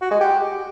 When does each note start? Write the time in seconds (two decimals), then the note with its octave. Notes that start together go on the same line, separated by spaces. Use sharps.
0.01 F#4
0.11 G#3
0.21 G4